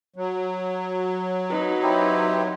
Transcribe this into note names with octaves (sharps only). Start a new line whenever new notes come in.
F#3
D#4 B4
C4 E4 G4